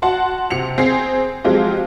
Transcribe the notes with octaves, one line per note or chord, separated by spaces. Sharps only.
F#4 F#5 A5 C6
C3 C#7 F7
C4 G#4 C7
F3 F#3 G#3 C4 F4 G4